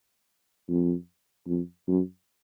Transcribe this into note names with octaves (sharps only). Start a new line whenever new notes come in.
F2
F2
F#2